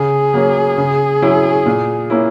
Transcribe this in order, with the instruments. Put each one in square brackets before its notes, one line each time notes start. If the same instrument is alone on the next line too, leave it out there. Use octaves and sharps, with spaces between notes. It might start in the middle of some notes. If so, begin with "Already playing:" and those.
Already playing: [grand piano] C#3 [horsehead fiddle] G#4
[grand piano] F#3 A#3 C#4
C#3
F#3 C#4 E4
A#2
A#3 C#4 E4